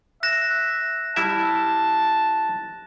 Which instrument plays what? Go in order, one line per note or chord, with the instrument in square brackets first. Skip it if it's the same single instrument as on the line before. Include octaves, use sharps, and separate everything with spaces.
[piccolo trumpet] E5 [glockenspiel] F#6 A#6 E7
[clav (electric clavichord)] G3 E4 E5 [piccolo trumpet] A5